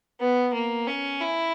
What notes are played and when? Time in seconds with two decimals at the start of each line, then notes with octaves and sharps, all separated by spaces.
0.20 B3
0.54 A#3
0.87 C#4
1.20 E4